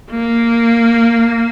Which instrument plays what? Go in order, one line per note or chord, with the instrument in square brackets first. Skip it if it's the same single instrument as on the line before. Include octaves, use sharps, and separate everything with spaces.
[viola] A#3